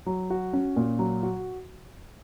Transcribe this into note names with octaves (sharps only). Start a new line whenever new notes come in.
F#3
F#4
C#4
A#2
F#3
F#4